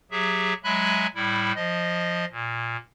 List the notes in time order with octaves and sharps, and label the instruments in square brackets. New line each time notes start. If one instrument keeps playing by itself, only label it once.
[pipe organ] F#3 G4 G#4 E5
F#3 G#3 E5 G#5 B5 F#6
A2 G3 E4
F3 D#5
A#2